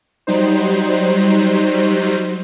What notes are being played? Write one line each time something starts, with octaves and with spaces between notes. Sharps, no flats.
F#3 G3 D#4 C5